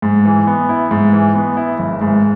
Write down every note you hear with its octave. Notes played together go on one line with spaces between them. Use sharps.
G#2
E3
B3
E4
G#2
E3
B3
E4
G#1
G#2